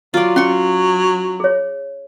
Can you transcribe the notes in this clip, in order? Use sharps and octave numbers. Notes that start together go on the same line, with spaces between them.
F#3 F4 D5
C#4 C6 C#6
G#4 C#5